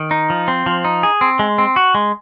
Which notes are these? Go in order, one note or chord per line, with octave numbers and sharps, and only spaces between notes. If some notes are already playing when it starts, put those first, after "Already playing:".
Already playing: D#3
D#4
F3
C4
F3
D#4
G#4
C4
G#3
C4
F#4
G#3